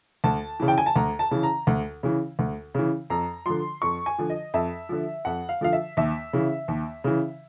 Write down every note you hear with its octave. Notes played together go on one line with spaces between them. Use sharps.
D2 A5
C#3 E3
G5
G#5
A5
D2 A#5
A5
C#3 E3
A#5
D2
C#3 E3
D2
C#3 E3
F2 A#5
D3 F3 C6
F2 C#6
G#5
D3 F3
D#5
F2 E5
D3 F3
F2 F#5
F5
D3 F3 F5
E5
D#2 E5
C#3 E3
D#2
C#3 E3